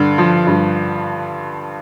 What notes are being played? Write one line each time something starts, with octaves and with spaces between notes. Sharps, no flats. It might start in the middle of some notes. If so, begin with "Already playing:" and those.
Already playing: G2 D3
F3
G2